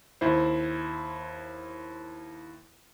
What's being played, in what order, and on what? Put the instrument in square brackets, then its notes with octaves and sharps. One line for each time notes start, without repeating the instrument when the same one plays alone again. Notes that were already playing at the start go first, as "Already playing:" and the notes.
[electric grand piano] D#2 E4 C5